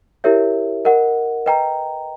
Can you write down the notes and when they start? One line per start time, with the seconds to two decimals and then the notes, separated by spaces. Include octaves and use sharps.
0.24 E4 G4 A#4 C#5 E5
0.85 A#4 D#5 F#5
1.46 B4 D#5 G5 A#5